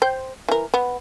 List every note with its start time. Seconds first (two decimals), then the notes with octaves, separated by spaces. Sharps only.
0.02 C5 G5
0.49 E3 A#4
0.74 B3